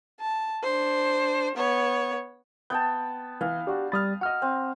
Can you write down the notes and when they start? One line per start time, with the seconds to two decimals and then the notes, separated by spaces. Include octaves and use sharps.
0.20 A5
0.63 D4 C5
1.56 B3 C#5
2.70 B3 G5 A5 G6
3.41 E3 F5
3.67 D4 F#4 G4
3.92 G3 B5 D#6 F6 A6
4.21 F#4 D#5 F#5 F6
4.42 C4